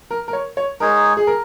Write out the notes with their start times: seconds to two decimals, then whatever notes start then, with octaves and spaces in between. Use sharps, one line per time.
0.11 A#4
0.28 A#4
0.33 C#5
0.57 C#5
0.80 G#3 D#4 G#4 A#4 C#5
1.17 G#4
1.27 A#4